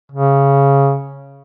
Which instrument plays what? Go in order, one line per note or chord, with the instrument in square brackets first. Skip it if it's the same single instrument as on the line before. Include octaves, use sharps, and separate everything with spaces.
[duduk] C#3